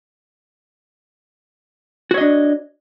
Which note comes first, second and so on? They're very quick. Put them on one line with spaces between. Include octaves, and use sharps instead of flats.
F#4 C#5 D#5 D4